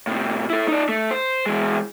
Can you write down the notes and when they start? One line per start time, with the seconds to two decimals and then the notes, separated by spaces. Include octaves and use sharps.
0.07 A2 C3
0.50 E4 A4
0.68 D#4 D5
0.89 A3
1.11 C5
1.46 E3 G#3